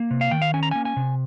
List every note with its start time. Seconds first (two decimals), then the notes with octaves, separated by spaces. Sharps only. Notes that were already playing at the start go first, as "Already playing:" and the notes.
Already playing: A#3
0.11 C3
0.21 F5
0.31 D#3 G5
0.42 F5
0.54 C#4 G#5
0.63 A#5
0.71 A#3 G#5
0.85 G#5
0.97 C3